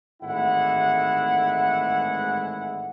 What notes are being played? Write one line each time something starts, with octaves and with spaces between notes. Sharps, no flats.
G#1 A2 E3 G#3 E4 F#5